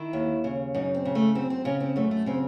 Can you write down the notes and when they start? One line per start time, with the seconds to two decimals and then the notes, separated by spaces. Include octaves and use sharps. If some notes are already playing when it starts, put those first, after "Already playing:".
Already playing: D#3 E4
0.13 D#2
0.44 C#3
0.74 F#2 D#4
0.95 C4
1.05 C#3
1.15 A3
1.35 F#2 C4
1.50 C4
1.65 C#3 C#4
1.80 C4
1.96 F#2 A3
2.11 A3
2.26 C#3 C4